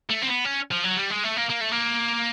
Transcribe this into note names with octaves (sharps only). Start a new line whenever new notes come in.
A3
C4
B3
C#4
F3
F#3
G3
G#3
A3
A#3
A#3
A3
A#3